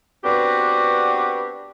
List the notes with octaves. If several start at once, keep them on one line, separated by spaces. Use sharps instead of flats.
B3 C4 D4 F#4 G4 B4